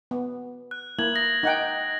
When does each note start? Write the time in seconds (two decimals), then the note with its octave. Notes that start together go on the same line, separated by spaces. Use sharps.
0.11 B3
0.71 F#6
0.99 A#3 E4 G#6 F#7
1.15 D#6 A#6 F#7
1.43 D#4 F#5 G5